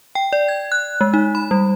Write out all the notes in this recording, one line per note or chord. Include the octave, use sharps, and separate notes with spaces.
G5
D5
G#6
F#6
G#3
D#4
B5
G3